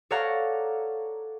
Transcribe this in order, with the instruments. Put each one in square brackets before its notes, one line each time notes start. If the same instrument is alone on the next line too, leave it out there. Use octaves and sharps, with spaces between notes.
[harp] A4 C#5 D5 F5 F#5 A#5